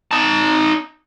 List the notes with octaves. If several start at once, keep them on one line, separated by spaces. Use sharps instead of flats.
D#4 A5